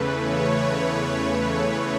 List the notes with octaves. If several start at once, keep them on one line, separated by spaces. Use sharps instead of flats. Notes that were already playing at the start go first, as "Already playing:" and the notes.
Already playing: E2 C#3 E3 A3 B4
C#5
C#5